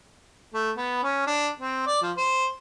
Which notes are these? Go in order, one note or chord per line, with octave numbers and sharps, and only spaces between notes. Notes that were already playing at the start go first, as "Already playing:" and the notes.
A3
B3
C#4
D4
C4
D5
F3
C5